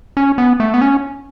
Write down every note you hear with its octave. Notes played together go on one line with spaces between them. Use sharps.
C#4
B3
A3
B3
C#4